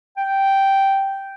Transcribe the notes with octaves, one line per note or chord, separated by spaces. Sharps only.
G5